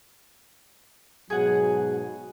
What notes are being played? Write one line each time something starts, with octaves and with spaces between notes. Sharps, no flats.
G#2 B2 F#3 G#4 F#5